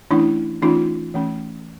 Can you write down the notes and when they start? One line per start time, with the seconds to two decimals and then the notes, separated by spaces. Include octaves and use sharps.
0.11 E3 A3 C#4 D4 E4
0.62 E3 A3 C#4 D#4 F4
1.14 E3 A3 C#4